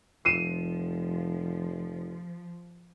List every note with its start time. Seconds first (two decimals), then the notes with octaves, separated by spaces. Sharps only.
0.25 F1 F3 C7 D#7 E7